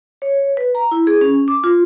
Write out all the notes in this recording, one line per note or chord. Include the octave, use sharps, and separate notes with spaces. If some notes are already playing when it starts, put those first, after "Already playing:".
C#5
B4
A#5
E4
G#4
C#4
D6
F4